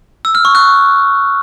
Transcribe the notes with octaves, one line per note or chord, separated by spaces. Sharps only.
E6
F6
C#6
F#6